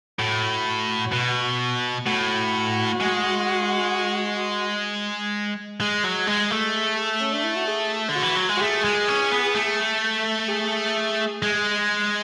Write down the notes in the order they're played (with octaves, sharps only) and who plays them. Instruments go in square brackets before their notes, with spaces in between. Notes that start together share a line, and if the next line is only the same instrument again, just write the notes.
[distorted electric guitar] A2 [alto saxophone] F#4
[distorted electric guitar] B2
[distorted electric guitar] A2 [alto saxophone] F#4
[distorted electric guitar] G#3
[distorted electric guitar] G#3 [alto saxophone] G#4
[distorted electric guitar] F#3
G#3
A3
[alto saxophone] C#4
D4
E4
F#4
G#4
[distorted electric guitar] D3
[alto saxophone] F#4
[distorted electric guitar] E3
F#3
G#3
[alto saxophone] F#4
[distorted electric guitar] A3 [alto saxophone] G#4
[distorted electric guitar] G#3
C#4
B3
A3
[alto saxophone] G#4
[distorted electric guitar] G#3